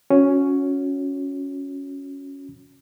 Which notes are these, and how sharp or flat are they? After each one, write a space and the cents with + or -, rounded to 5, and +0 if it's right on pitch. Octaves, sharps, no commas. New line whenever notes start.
C#4 +5 F#4 -25